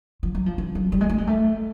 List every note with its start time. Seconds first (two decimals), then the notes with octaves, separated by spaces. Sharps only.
0.23 F3
0.35 F#3
0.46 F3
0.58 E3
0.75 F#3
0.92 G3
1.01 G#3
1.10 A3
1.18 G#3
1.27 A3